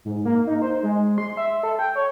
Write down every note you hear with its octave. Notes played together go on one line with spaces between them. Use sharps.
G#2
A#3
D#4
C5
G#3
C6
E5
A4
G5
C#5